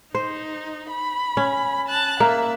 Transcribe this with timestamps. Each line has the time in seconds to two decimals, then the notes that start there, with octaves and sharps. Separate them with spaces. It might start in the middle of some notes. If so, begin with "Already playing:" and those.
0.15 D#4 C5
0.90 B5
1.37 C#4
1.89 A5 F#6
2.20 A#3 E5